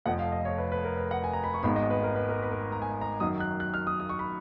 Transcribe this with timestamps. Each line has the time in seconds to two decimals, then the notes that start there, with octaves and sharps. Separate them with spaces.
0.05 F1 F2 F3 F#5
0.19 F5
0.32 D#5
0.45 C#5
0.58 B4
0.72 B4
0.85 A#4
0.97 B4
1.11 F#5
1.24 G#5
1.33 A#5
1.44 B5
1.54 C#6
1.63 G#1 G#2 D#3 G#3 B3 B5
1.76 D#5
1.90 B4
2.03 A#4
2.16 B4
2.29 A#4
2.42 B4
2.51 A#4
2.72 A#5
2.82 G#5
3.01 A#5
3.20 F#2 D#3 F#3 D#6
3.40 F#6
3.60 F#6
3.74 F6
3.87 D#6
4.00 D#6
4.09 C#6
4.19 B5